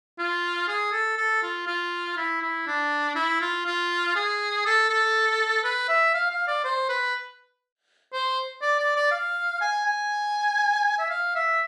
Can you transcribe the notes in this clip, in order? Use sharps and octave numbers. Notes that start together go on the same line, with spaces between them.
F4
G#4
A4
A4
F4
F4
E4
E4
D4
E4
F4
F4
G#4
A4
A4
B4
E5
F5
F5
D5
C5
B4
C5
D5
D5
D5
F5
G#5
G#5
E5
F5
E5